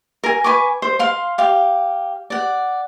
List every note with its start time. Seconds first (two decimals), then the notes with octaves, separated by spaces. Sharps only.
0.24 A#4 G#5
0.44 B4 G#5 C#6 D6
0.82 C5
0.99 F5 C6
1.38 G4 F5
2.30 D5 F#5